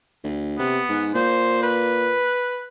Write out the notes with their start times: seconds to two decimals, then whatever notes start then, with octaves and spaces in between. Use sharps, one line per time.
0.24 D2
0.59 C3 B3
0.89 G#2
1.14 A#2 C5
1.63 B4